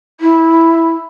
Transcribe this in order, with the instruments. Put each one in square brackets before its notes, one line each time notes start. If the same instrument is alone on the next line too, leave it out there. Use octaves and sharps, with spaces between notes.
[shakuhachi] E4